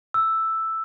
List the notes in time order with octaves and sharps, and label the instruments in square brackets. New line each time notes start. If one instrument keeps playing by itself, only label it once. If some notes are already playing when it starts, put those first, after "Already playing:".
[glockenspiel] E6